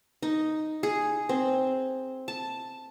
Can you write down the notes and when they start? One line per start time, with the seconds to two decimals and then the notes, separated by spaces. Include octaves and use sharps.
0.23 D#4
0.83 G#4
1.29 C4
2.28 A5